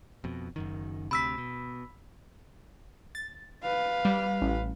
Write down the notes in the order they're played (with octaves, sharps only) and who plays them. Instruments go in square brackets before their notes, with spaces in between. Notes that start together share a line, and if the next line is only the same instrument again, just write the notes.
[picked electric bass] F2 B2
F#1 F#2 D#3
[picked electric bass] D2 C3 [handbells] B5 E6 B6
[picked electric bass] B2
[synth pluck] A6
[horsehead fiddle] B4 F5
[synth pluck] G3
A1